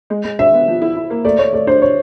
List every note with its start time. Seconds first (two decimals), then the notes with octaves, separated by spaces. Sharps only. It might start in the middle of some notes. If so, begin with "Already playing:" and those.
0.10 G#3
0.24 G#3
0.39 D4 E5
0.54 B3
0.68 F3
0.82 E4
0.96 E4
1.10 A#3
1.25 A3 D5
1.39 A3 C#5
1.53 A3 D5
1.67 D4 C5
1.82 C#5